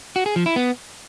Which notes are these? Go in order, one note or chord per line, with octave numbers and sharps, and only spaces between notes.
F#4
G#4
F3
E4
B3